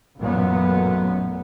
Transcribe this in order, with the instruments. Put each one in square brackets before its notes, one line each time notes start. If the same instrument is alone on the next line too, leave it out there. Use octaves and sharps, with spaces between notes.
[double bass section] A1 F#2 A#2 B3